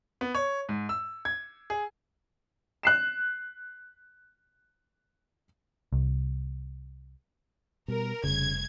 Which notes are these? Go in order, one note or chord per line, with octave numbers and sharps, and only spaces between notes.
B3
C#5
G#2
E6
G#6
G#4
F#6 C7 E7
C2
B2 G3 A#4
F1 C#3 G3 G#6